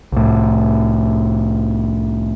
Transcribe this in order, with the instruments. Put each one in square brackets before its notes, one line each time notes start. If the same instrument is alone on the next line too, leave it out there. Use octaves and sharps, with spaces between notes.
[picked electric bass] C2 A2